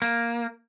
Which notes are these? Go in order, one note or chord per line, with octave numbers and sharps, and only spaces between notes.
A#3